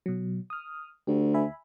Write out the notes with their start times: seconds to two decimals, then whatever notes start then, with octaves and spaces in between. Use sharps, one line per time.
0.06 B2 F#3
0.50 D#6 F6
1.07 D2 G4
1.34 E5 G#5 B5